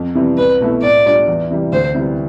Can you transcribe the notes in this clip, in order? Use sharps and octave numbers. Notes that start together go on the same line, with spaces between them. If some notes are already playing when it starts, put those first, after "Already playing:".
Already playing: F2
C3 E3 G3 C4
C2 B4
B2 A3 E4
A2 D5
G3 D4 F4
E2
C3 E3 G3
D2 C5
C3 E3 G3